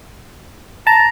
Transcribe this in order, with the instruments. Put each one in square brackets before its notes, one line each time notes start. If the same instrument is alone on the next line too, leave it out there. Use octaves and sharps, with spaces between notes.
[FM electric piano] A5 [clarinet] A#5